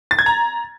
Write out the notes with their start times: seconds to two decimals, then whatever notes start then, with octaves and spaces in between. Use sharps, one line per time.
0.11 A6
0.19 G#6
0.26 A#5